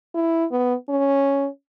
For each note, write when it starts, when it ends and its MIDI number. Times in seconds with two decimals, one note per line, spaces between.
0.15 0.45 64
0.51 0.74 59
0.89 1.48 61